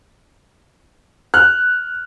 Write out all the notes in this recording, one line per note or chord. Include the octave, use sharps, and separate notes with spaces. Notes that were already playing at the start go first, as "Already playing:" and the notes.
F6 F#6